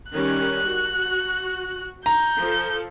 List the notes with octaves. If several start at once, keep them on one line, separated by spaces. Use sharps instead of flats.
D#3 G3 C#4 F#6
F#4
A#5 G6
F3 A4